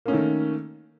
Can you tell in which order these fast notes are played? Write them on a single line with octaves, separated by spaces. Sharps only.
A#3 C#4 A3 D#3